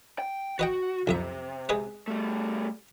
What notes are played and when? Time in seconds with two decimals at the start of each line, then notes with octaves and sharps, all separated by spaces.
0.19 G5
0.59 F#4 B4 D#5 G5
1.07 B1 F2 C3 E5
1.69 G#3 G#4 B4
2.08 G3 A3